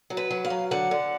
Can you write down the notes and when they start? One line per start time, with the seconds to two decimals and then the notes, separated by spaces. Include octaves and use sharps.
0.10 F#3
0.17 B4
0.31 F#3
0.45 F5
0.50 F#3
0.71 D3 F#5
0.91 D3